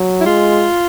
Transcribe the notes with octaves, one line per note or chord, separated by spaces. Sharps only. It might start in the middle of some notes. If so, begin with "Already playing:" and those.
Already playing: F#3
E4
G#3 F4